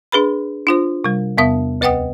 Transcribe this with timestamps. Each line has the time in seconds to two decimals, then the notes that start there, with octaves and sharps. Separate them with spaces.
0.12 D4 G#4 B4 B5
0.67 D4 F4 C5
1.04 C3 G3
1.38 E2 C3 B3 E5 D#6
1.81 D2 B4 D#5 F#5 G5 D#6